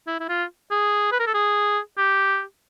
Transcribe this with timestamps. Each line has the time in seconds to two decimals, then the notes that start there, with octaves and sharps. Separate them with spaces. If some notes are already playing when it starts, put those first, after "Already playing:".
0.07 E4
0.20 E4
0.29 F4
0.71 G#4
1.12 B4
1.20 A#4
1.27 A4
1.34 G#4
1.98 G4